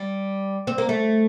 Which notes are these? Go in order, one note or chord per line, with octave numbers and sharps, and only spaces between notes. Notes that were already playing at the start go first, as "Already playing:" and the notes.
Already playing: G3
C4
A#3
A3